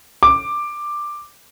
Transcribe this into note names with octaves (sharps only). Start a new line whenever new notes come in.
D6